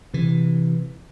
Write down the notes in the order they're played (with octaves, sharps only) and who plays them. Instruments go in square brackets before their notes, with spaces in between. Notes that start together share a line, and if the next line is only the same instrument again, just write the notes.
[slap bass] C3 E3